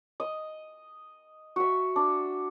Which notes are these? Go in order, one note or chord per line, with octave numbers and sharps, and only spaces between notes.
D#5
F#4 E5
D4